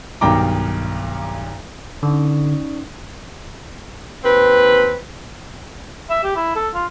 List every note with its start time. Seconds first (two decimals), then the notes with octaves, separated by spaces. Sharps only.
0.21 B1 G2 D#3 G5 A#5 D6
2.03 D3 C#4 D#4 D5
4.24 D#2 C4 B4
6.10 E5
6.24 G4
6.36 E4
6.56 A4
6.74 F4